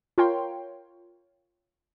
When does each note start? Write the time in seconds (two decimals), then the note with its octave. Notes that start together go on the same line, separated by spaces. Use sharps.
0.18 F4 A#4 C#5 G5 C6